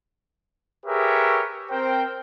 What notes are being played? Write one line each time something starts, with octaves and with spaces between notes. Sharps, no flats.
G4 G#4 A#4 B4 C#5 E5
C4 A#4 C5 G5